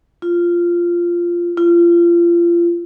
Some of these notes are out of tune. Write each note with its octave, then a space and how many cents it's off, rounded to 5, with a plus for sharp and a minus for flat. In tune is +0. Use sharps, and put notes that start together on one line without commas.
F4 -10
F4 -30